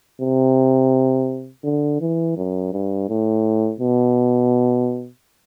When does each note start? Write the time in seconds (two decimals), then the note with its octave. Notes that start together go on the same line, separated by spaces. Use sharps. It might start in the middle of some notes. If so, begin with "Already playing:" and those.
0.22 C3
1.64 D3
2.01 E3
2.37 F#2
2.73 G2
3.09 A2
3.80 B2